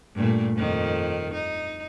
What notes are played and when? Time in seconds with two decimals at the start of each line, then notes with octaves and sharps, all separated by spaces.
0.16 G2 A#2 A3
0.56 F2 D#3
1.34 D#4